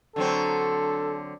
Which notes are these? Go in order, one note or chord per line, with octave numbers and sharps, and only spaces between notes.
D3 F#3 C4 A4